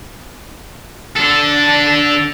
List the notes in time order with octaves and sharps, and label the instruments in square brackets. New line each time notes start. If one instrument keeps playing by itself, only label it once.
[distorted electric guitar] D4 A4